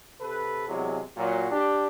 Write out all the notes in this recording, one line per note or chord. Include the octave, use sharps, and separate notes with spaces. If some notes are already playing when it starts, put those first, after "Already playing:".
C3 A4 B4
E2 C3 F#3 G#3
A#2 F#3
D4 G4